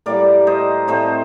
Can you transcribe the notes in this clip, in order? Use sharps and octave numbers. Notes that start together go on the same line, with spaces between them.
A2 G3 A#3 A#4 D5
C5 D#5
A2 A3 C4 C5 D#5